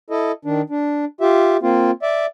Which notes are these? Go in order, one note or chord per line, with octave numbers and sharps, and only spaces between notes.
E4 A4 D#5
D#3 D4
D4
F4 G4 E5
A#3 C4 F4
D5 E5